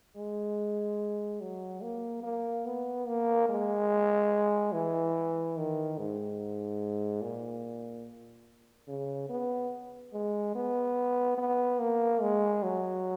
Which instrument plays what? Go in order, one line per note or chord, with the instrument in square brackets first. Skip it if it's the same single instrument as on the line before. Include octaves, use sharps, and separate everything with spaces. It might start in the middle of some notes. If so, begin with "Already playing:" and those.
[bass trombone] G#3
F#3
A#3
A#3
B3
A#3
G#3
E3
D#3
G#2
A#2
C#3
B3
G#3
B3
B3
A#3
G#3
F#3